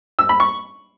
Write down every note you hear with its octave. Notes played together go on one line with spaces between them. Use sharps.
E6
B5
C#6